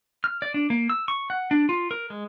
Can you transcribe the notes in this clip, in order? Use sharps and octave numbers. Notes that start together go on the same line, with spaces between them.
F6
D5
D4
A#3
E6
C#6
F#5
D4
F4
A#4
G#3